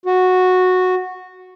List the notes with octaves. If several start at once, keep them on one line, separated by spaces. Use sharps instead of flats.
F#4